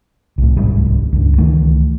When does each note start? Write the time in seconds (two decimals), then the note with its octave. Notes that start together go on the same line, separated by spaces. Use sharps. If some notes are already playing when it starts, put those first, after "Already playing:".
0.38 C2 A2
0.57 D1 C2 G#2 G3
1.13 C#2 G2
1.38 C#2 D#3 E3 A3